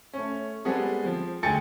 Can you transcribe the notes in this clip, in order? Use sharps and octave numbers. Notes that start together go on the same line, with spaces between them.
A3 C#4
G3 G#3 B3 C4 G#4 A4
F3 C4
D2 G#3 G5 G#5 A6 C#7